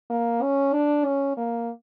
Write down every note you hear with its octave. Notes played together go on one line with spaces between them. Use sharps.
A#3
C#4
D4
C#4
A#3